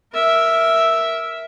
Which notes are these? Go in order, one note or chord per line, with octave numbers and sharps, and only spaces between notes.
A#4 E5